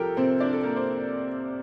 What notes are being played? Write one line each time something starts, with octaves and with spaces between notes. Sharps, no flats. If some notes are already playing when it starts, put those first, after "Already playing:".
Already playing: C2 F3 G4 A4 A#4 G5
C3 C4 C5
D4 D5
A4
A#3 A#4
C5